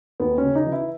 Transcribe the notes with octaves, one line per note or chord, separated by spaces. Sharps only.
D#2 B3
C#4
C#3
D#4
E3
E4